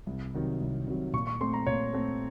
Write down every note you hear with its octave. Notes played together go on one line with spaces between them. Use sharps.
C2
C3 D#3 F#3
C2
C3 D#3 F#3
A#2 C#6
C#6
A3 C4 C6
A#5
A#2 C#5
A3 C4